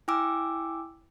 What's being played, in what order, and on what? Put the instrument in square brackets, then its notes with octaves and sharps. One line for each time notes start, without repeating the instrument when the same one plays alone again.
[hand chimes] E4 G5 G#5 D6 E6